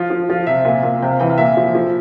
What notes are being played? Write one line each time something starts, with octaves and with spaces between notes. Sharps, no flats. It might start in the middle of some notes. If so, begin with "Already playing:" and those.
Already playing: F3 F4
F3
F3 F4
C3 E5
A#2
A#2
C3 G5
F5
E3 G5
F5
A#2 E5
F3
F3